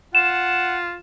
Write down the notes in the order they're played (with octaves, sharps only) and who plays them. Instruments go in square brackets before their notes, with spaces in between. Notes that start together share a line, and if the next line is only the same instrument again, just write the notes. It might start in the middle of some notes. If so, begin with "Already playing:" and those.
[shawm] F4 [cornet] F#5 [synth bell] E7